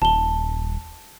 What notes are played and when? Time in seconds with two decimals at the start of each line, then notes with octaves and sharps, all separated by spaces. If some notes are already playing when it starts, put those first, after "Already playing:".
0.02 D#1 A5 G7